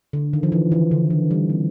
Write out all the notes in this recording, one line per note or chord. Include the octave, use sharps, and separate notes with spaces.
D3
D#3
F3
E3
E3
D3
D#3
G3
C4